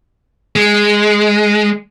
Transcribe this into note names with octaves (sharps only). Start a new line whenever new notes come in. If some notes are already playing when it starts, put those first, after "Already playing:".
G#3